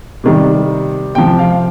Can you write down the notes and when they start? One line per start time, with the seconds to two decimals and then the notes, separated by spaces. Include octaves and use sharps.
0.24 C3 D#3 G3
1.15 C3 F3 G5
1.39 F5